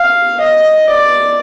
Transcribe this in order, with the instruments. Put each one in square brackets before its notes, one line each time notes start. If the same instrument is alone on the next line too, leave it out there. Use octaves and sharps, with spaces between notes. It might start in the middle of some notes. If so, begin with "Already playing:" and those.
Already playing: [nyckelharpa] F5
D#5
D5